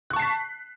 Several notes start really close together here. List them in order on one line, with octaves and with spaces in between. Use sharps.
F#6 C#6 A5 C7 B6